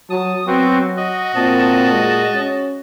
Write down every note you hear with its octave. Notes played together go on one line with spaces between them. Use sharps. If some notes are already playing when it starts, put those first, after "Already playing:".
F#3 A5 D#6
F#3 B3 C4 F#4
F#4 D#5
A#2 C4 D#5 A5
G#3
C#4